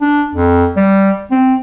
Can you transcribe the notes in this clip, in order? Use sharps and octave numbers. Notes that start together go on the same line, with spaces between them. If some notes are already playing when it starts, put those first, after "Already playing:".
D4
F2
G3
C4